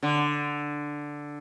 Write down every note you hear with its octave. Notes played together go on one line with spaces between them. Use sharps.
D3